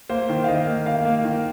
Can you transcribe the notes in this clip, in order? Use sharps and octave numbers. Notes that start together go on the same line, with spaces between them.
A#3 C5
D#3
F5
D#3 D#5
A#3
A#3 F5
A#3
D#3